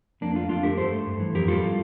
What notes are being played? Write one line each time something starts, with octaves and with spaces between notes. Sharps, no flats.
F2 A#3 D4
A3 D4 F4
F2 D4 F4
A3 G4 A#4
G2 A4 C5
A3
G2
E3
F2 G4 A#4
G3 F4 A4